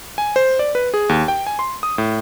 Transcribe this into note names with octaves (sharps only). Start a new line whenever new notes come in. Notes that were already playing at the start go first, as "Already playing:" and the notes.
G#5
C5
D5
B4
G#4
D#2
G5
G#5
C6
D#6
A2